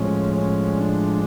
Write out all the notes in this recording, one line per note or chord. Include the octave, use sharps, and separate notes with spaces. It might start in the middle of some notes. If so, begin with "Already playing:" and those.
Already playing: A2 F3 G#3 C#4
C#4
D4